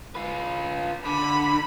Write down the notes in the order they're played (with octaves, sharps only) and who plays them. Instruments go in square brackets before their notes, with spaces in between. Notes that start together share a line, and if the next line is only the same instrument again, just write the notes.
[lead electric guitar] F4 B4
[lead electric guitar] D3 [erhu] B5